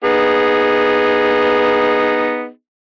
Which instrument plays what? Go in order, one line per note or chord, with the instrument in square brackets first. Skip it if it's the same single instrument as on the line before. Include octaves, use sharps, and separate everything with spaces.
[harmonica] B3 D#4 G#4